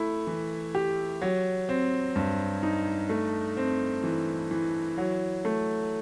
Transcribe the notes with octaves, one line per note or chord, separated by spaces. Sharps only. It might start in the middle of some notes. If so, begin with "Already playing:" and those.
Already playing: A3 E4
E3
G4
F#3
C4
G2
D#4
A3
C4
E3
E3
F#3
A3